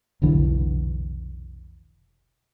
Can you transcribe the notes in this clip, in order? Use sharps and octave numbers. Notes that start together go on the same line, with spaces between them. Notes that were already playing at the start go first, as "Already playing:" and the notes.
F1 B1 D3 E3